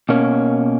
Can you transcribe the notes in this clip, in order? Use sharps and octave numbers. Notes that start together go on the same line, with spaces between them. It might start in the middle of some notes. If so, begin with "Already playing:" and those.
B2 A#3 C#4